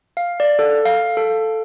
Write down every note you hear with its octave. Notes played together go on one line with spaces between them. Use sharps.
F5
D5
A4
F5
A4